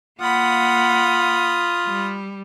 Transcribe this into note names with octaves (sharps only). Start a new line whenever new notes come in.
A#3 F4 F#5 B5 D#6
G3